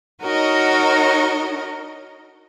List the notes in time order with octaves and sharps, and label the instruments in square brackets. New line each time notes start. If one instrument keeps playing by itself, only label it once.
[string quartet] D#4 F#4 A#4 C#5 D#5